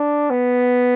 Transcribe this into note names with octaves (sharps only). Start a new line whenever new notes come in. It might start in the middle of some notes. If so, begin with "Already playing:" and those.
Already playing: D4
B3